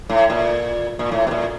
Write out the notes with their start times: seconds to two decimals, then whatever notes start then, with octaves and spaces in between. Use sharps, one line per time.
0.10 A2
0.30 A#2
0.99 A#2
1.12 A2
1.27 B2
1.31 A#2